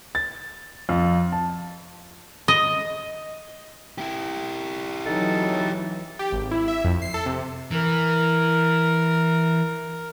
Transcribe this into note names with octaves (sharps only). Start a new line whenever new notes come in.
A6
F2
A5
D#5
E4 G4
E3 F#3 D#4 A4
G4
G#1
E4
E5
F2
C7
A4
C3
E3 A#4